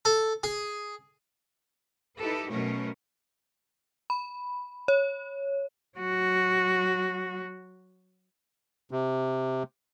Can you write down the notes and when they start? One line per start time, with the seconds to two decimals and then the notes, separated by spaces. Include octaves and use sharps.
0.05 A4
0.43 G#4
2.20 D#4 E4 G4 A4 B4
2.50 B2 F#3 A3 C#4 A#4
4.10 B5
4.88 C#5
5.98 F#3 F#4
8.91 C3